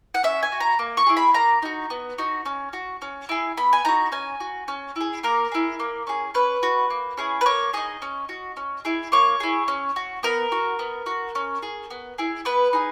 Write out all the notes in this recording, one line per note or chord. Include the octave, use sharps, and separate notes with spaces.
F#5
C#4 E5
G#5
F#4
A#5
A#3
C#6
E4 G#4
B5
A#3 A#5
D#4 F#4
B3
D#4 F#4
C#4
F#4
C#4
E4 G#4
B3 B5
G#5
D#4 F#4 A#5
C#4 G#5
F#4
C#4
E4 G#4
A#3 A#4
E4 G#4
A#3
C#4 G#4
C#4 B4
F#4
A#3
C#4 E4 G#4
B4
A#3 C#5
D#4 G#4 D#5
C#4
F#4
C#4
E4 G#4
A#3 C#5
E4 G#4
C#4
F#4
B3 A#4
F#4
B3
F#4
C#4
G#4
B3
E4 G#4
B3 B4
D#4 G#4